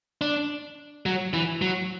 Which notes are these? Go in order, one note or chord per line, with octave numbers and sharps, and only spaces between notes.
D4
F#3
E3
F#3